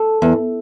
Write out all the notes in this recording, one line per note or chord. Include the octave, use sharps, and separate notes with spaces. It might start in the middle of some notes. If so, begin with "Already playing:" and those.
Already playing: A4
E2